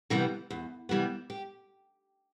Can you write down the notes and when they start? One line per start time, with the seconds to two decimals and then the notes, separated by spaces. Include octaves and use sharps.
0.10 C3 E3 G3 B3
0.50 E2
0.89 C3 E3 G3 B3
1.30 G4